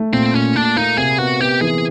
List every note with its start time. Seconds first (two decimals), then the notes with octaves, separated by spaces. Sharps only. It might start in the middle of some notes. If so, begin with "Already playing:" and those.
Already playing: A3
0.13 A#2 C4
0.34 A#2 C#4
0.55 A#2 D4
0.76 A#3 D#4
0.97 C3 G#4
1.18 B3 F#4
1.40 B3 G4
1.61 E3 G#4